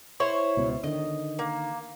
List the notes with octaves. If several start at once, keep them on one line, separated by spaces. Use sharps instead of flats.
E4 C5 C#5
C#2 B2
D3 D#3 D#5
A#3